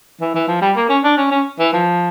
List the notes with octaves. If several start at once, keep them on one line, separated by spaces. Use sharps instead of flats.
E3
E3
F3
G3
A#3
C#4
D4
C#4
C#4
E3
F3